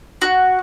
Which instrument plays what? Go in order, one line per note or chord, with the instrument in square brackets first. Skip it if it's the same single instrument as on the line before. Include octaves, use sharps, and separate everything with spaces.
[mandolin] F#4